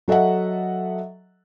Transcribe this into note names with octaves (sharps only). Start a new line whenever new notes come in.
F#3 A4 D#5 E5 F#5